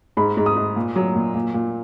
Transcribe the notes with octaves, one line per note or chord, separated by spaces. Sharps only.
G#2 B5
G#2
D#6
G#2
A#2
F#3
A#2
A#2
A#2